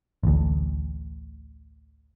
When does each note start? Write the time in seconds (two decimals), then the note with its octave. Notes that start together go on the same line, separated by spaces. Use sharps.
0.23 A1 D2